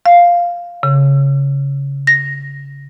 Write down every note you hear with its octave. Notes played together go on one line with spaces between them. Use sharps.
F5
C#3
A#6